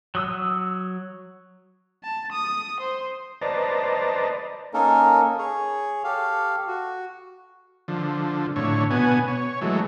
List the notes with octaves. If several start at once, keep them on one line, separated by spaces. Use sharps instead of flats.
F#3 D#6 E6
A5
D#6
C5
B4 C5 D5 D#5 A5 A#5
A#3 C#4 D#4 A4 A#4
G#4 C#5
G4 A4 F5
F#4
D3 F3
A2 D3 C#5
B2 B3 G#5
C#5
E3 F#3 G#3 A3